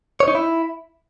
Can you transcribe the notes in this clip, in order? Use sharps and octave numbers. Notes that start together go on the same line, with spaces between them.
C#5
D#4
E4